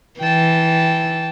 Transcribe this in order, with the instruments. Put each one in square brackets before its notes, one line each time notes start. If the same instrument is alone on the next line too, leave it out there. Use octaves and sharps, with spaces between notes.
[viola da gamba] E3 [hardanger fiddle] G5 A5